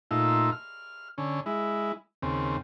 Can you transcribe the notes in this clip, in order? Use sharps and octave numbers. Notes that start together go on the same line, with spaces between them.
A#2 A3 D#4 F4 E6
F6
D3 C#4
G#3 E4
D#2 C#3 C4